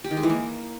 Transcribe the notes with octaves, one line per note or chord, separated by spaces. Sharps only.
G4
D#3
G#3
E3
A#3